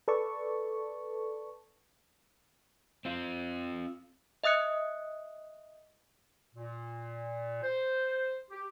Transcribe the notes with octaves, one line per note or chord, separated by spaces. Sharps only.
A4 B4 D5 A5 C#6
C4 F4
D#5 E5 D#6 F#6 C#7
A#2
C5
G4